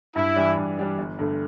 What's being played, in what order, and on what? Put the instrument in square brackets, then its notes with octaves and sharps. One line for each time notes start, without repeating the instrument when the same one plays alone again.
[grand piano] G2 [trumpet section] E4
[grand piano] E3 G3 D4
G2
E3 G3 D4
G1
G2 D3 A3